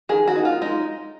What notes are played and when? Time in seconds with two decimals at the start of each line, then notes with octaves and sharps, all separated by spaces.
0.09 D#3 G#4
0.28 F#4
0.36 A#3 D#4
0.45 F4
0.62 G#3 D#4